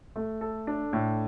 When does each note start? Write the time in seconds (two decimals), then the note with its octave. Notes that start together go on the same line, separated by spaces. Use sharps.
0.16 A3
0.41 A4
0.67 D4
0.93 A2